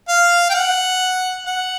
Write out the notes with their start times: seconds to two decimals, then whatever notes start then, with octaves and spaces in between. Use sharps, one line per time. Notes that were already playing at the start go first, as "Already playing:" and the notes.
0.09 F5
0.50 G5
0.54 F#5
1.46 F#5